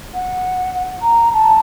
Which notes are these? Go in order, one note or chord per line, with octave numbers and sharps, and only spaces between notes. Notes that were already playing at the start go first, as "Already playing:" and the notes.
F#5
A#5
A5